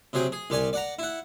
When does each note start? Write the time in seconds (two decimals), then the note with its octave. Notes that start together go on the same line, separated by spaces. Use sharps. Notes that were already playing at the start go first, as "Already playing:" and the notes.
0.13 C3 F#3 G#4 G5
0.32 G#4
0.50 C2 G4 D5 G#5
0.73 D5 F#5 A#5
0.99 E4 F#5